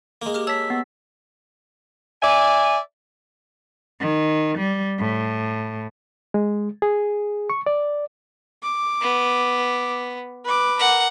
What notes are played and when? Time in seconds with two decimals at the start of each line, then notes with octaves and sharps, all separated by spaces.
0.22 G#3 A#3
0.34 G4 D6 F6
0.47 G#4 C#5 A5 E6 B6
0.70 B3
2.22 D5 E5 G#5
4.00 D#3
4.58 G3
4.99 A2
6.34 G#3
6.82 G#4
7.50 C#6
7.66 D5
8.63 D6
9.01 B3
10.44 B4 D6
10.78 A#4 F#5